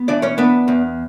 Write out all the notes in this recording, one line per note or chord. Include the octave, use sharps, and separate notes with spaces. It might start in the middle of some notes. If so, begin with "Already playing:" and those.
Already playing: B3
E3 D4 D5
C#4 C#5
B3 D4 B4
E2